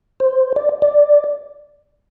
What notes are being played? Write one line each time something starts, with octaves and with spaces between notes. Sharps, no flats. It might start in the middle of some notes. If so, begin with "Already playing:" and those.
C5
D5
D5